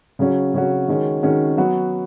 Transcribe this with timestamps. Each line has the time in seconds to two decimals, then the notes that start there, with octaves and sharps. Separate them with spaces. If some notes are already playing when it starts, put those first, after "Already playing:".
0.19 C#3 F#3 C#4 F#4
0.54 C#3 F#3 C#4 F#4
0.88 D#3 G#3 C#4 F#4
1.23 D#3 G#3 C#4 F#4
1.57 F#3 B3 F#4